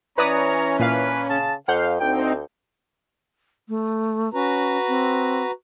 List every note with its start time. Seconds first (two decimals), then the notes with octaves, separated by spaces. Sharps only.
0.18 E3 C#4 B4 C#5 D5 A#5 D#6
0.79 A#2 A#3 D4 B4 F5
1.30 C#3 A5
1.68 F2 F5 F#5 G6
2.00 D2 C4 D#4 G5
3.69 A3
4.34 C#4 F#4 B4 A#5
4.88 C4